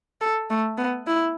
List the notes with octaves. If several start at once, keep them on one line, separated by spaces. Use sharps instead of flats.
A4
A3
B3
E4